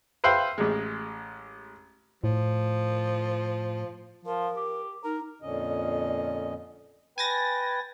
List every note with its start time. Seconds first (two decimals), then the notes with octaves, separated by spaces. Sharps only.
0.24 B4 C5 E5 F5 G5
0.58 A1 G#3
2.24 A2 F3
4.26 F3 A#4
4.57 G4
5.04 D#4 A#4
5.42 F2 A#2 D3 C#4 D#5
7.18 B4 G5 G#5 A6 A#6